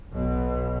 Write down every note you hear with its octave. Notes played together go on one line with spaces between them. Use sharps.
B1 B2